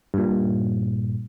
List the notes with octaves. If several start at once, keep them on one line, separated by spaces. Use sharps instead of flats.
G2 A#2